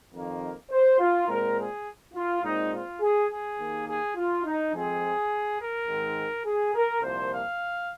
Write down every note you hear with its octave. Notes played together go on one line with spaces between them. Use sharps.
F2 D#3 A#3
C5
F4
A#2 G#3 C4 A#4
G#4
F4
A#2 G#3 C4 D#4
F4
G#4
G#4
D#2 D#3 A#3
G#4
F4
D#4
F2 F3 G#3 C4 G#4
A#4
G#2 D#3 G#3 C4
G#4
A#4
C2 A#2 F3 A#3 C5
F5